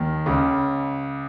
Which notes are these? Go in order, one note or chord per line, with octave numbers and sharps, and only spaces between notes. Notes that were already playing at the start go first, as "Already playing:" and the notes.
Already playing: D#2 D#3
C#2 C#3